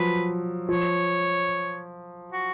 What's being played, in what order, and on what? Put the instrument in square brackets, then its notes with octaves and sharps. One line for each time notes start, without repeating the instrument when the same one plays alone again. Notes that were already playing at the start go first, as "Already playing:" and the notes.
Already playing: [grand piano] F3 F#3 [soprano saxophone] B4
[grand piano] F3 [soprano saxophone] C#5
[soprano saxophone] F#4